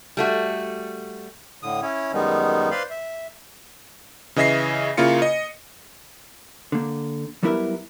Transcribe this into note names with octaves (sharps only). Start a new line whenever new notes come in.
G3 A3 F#4
A2 D3 D#6
C#4 E4 C#5
F#2 D#3 G3 G#3 B3 D#4
B4 C5 D5 F5 B5 C6
E5
C#3 E3 D#5 E5 A#6 C7
C#3 A#3 E4 F4 C#7
D#5
D3 A#3
F#3 G3 B3 E4 A#4 E5